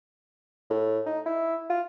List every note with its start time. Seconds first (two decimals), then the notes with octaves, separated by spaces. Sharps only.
0.70 A2
1.06 D#4
1.26 E4
1.70 F4